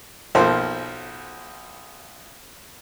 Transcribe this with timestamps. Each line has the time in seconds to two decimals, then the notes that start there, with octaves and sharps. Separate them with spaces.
0.35 B1 F3 A#3 C5